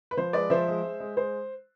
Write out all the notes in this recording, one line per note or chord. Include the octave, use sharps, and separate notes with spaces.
B4
F3 C5
G#3 B4 D5
F3 C5 E5
G#3
G#3
G#3
G#3 C5